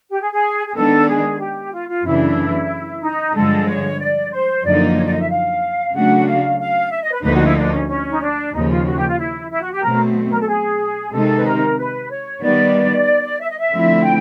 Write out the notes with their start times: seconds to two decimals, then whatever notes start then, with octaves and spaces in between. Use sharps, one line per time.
0.10 G4
0.21 G#4
0.32 G#4
0.67 G#4
0.75 D#3 G#3 B3 D4 A4
1.07 G#4
1.40 G4
1.72 F4
1.89 F4
2.04 F#2 C#3 E3 A3 D4 E4
3.02 D#4
3.35 G2 D3 F3 G#3 A4
3.67 C#5
3.99 D5
4.32 C5
4.64 F#2 D3 F3 A#3 D#4 D5
4.96 C#5
5.04 D5
5.13 D#5
5.20 E5
5.29 F5
5.94 C#3 F#3 A3 D4 F#4 F#5
6.26 F5
6.59 F5
6.90 E5
7.02 D#5
7.12 B4
7.23 D2 D3 F3 A#3 D#4 B4
7.34 F#4
7.45 E4
7.56 D4
7.72 C#4
7.89 C#4
8.10 D#4
8.21 D4
8.53 D#2 C#3 F3 D#4
8.69 F4
8.86 F#4
8.97 G4
9.07 F4
9.18 E4
9.50 E4
9.61 F#4
9.72 G4
9.83 B2 F#3 A3 C4 A#4
10.31 A#4
10.40 A4
10.48 G#4
11.12 C3 D#3 G#3 C4 D#4 A4
11.34 B4
11.45 A#4
11.78 B4
12.10 C#5
12.42 D#3 G3 B3 D5
13.40 E5
13.49 D#5
13.58 E5
13.73 D3 F3 A3 C4 E4
14.04 G5